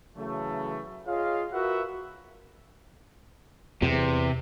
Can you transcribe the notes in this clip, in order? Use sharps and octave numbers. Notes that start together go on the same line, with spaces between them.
C#3 E3 F#3 A3
F4 G#4 C#5 D#5 F5
F4 F#4 A#4 B4 E5 F#5
E2 C3